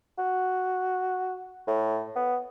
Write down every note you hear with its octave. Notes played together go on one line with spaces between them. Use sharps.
F#4
A2
B3